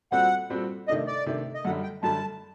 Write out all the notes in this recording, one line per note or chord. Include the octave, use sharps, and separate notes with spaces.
A#2 G3 C4 F#4 A4 F#5
A#2 G3 C4 F#4 A4
C3 D#3 A3 D4 D#5
D5
C3 D#3 A3 D4
D#5
F#2 D3 G3 F#5
G5
F#2 D3 G3 A5